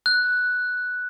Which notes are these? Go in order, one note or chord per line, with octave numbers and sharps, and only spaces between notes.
F#6